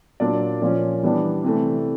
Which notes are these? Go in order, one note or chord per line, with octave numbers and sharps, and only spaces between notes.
A#2 F#3 A#3 D4 D5
A#2 F3 A#3 C#4 D5
E3 G3 B3 D4
C3 E3 A3